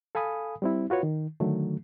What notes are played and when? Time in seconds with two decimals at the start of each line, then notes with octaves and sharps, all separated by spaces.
0.15 A4 F5 G#5 B5 D#6
0.62 G3 C4 E4
0.90 F4 F#4 B4 C#5
1.03 D#3
1.40 D3 D#3 F#3 A3